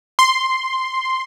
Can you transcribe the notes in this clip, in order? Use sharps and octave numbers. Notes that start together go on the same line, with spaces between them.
C6